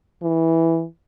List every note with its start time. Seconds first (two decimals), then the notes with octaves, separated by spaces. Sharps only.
0.22 E3